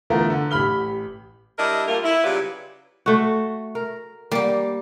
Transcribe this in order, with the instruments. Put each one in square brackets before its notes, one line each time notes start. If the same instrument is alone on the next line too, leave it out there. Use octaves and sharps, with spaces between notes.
[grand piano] D3 E3 A3 B3 F4 A#4
D3
A1 G4 B5 F6 G7
[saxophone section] G3 D4 E4 A#4 D#5
A#2 G3 A3 A#3 F4 A#4
E4
C#3 F#3 G3 F4 G4 B4
[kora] A3 F#4
A#4
[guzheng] G3 G4 [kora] A#3